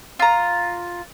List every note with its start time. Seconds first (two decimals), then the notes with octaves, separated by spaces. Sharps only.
0.19 F4 A#5